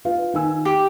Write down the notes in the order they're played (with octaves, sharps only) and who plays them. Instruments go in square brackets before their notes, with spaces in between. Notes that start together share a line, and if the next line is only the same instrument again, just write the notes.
[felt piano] F4 B4 F5
D#3 G#5 E6
[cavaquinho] G4